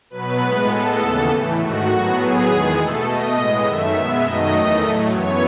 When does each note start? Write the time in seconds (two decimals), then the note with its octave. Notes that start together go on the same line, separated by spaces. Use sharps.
0.10 B2 F#3 B3 B4
0.40 A2 G#3 B3
0.69 A2 G#3 B3 A4
0.99 D#2 C#3 E3 B3
1.29 A2 E3 A3
1.58 G#2 D#3 A3 F#4
1.88 A2 F#3 B3
2.17 A2 F#3 B3 G#4
2.46 E2 D#3 G#3 B3
2.76 B2 A3 A4
3.06 B2 A3 D#5
3.35 A2 G#3 B3
3.65 F#2 D#3 A3 E5
3.94 B2 G#3 B3
4.24 F#2 D#3 F#3 A3 D#5
4.54 E2 D#3 A3
4.82 A2 F#3 A3
5.12 F#2 E3 B3 C#5